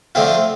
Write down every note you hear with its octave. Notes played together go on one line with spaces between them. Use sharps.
D3 F3 A3 C4 F4